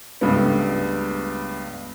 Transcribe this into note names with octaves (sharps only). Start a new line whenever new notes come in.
C#2 G2 G3 A3 B3